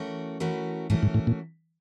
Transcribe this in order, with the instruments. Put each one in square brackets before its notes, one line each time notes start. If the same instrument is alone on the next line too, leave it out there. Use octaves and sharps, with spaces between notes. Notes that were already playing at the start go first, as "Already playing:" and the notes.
Already playing: [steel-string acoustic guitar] E3 A3 C#4 F#4 A#4
E3 A3 C#4 F#4 A#4
[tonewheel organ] G#2 [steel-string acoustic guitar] E3 A3 C#4 F#4 A#4
[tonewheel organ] G#2
A2
A#2